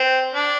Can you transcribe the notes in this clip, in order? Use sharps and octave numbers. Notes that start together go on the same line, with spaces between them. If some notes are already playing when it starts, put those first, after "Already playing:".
Already playing: C4
D4